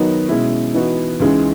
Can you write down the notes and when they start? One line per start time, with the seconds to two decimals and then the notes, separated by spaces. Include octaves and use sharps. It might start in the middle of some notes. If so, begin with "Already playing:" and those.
Already playing: D#3 F#3 B3 D#4 F#4
0.29 B2 G#3 C#4 E4
0.74 E3 B3 D#4 F#4
1.20 C#2 C#3 E3 G#3 D#4